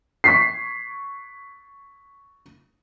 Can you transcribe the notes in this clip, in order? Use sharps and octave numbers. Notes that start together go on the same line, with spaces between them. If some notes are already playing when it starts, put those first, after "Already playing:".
C#6 B6 C7